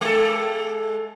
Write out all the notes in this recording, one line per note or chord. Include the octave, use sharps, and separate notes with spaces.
G#3 A4